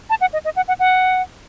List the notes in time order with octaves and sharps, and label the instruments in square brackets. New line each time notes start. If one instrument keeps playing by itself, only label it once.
[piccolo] A5
F#5
D#5
D#5
F#5
F#5
F#5